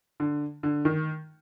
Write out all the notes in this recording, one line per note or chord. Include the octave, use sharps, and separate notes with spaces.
D3
D3
D#3